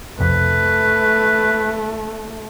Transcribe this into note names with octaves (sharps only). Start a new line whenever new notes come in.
B1 F2 C3 A3 B4